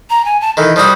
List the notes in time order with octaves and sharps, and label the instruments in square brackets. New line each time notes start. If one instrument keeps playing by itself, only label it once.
[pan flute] A#5
G#5
A5
[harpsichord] D#3 E3 [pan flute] A4
[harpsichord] F3 G3 F#4 [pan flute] D#6